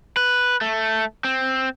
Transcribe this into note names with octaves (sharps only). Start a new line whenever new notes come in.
B4
A3
C4